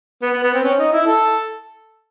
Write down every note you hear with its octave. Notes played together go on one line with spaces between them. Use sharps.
B3
B3
B3
C4
C#4
D#4
E4
A4